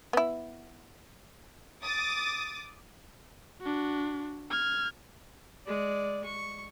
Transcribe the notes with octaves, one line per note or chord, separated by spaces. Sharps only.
B3 E4
D6 D#6 A6
D4 F#4
F6 G#6
G#3 D5
C#6